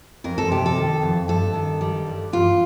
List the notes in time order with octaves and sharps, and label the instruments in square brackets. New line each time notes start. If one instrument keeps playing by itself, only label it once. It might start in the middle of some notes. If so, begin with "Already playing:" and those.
[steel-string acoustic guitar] F2 A#4
A4
C3 G4
A4
D#3
F2
G2 A4
D#3
G3
G2
G2 F4